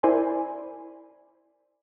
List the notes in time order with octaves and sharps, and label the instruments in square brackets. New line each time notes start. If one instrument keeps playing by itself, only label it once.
[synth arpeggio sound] E4 A#4 C5 D5 G#5 B5